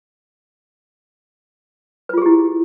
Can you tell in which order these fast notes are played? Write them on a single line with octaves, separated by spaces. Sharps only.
B4 F4 G#4 G4 E4